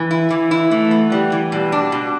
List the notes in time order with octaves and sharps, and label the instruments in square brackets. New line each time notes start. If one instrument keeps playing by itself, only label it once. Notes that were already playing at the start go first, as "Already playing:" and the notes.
Already playing: [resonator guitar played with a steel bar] E3
E4
E3
E4
[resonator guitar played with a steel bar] E3 [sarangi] A3
[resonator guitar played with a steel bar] B3
[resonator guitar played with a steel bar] E3 [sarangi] G3
[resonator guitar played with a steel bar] E3
[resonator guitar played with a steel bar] B2 [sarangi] G3
[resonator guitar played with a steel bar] D4
B2